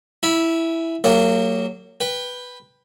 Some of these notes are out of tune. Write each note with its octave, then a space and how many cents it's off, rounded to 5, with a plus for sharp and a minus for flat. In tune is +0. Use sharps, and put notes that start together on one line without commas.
E4 +0 G#5 +10 B5 -20
F#3 +5 A#3 -35 G4 +35
B4 +0 G5 +15